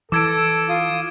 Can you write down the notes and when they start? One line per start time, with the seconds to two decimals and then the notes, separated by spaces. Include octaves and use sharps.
0.12 E3 A4 D6 G#6 D7
0.69 F4 D#6